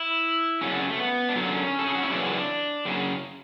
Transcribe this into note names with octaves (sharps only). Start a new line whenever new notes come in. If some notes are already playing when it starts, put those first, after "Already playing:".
Already playing: E4
F#2 C#3 F#3 C#4
D4
C#4
A3
B3
D4
F#2 D3 F#3 C#4
A4
G#4
F#4
E4
F#2 C#3 E3 D4
F#2 C#3